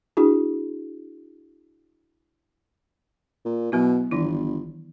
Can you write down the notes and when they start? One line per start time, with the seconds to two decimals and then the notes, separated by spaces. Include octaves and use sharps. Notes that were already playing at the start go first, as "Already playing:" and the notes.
0.17 D4 E4 F#4 G#4
3.45 A#2
3.72 B2 F#3 B3 E4
4.12 G1 D#3 E3 E4